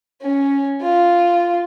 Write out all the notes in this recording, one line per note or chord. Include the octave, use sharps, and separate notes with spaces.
C#4
F4